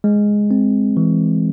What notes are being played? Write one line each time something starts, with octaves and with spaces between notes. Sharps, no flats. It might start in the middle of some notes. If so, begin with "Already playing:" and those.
G#3
C4
E3